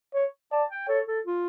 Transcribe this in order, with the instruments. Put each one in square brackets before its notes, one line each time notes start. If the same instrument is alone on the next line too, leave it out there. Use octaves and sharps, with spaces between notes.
[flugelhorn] C#5
[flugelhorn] D5 [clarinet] A5
[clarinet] G5
[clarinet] A4 [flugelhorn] C#5
[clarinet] A4
F4